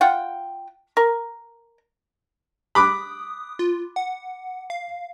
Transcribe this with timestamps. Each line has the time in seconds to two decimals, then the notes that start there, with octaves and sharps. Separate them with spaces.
0.01 F4 F#5 G5
0.97 A#4
2.75 B5 D6 D#6 F#6
3.59 F4
3.96 F#5
4.70 F5